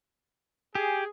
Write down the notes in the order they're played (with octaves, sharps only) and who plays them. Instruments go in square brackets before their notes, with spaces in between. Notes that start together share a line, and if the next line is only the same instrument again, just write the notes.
[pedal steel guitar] G4 [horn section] G#4